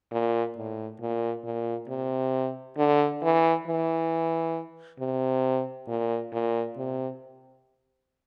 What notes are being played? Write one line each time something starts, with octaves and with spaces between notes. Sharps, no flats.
A#2
A2
A#2
A#2
C3
D3
E3
E3
C3
A#2
A#2
C3